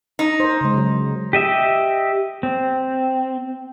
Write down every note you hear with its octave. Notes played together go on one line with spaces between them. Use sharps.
D#4
A#4 C5
C#3 G#3
C#3 F#3
G4 D#5 E5
C4